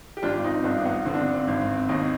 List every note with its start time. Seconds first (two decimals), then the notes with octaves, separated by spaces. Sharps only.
0.17 G4
0.23 G#1 D4 F4
0.44 C4 D#4
0.64 G2 B3 D4
0.86 B3
1.06 D3 C4
1.14 D4
1.22 C4
1.34 C4
1.48 G#1
1.61 C4
1.89 D#2 C4 D#4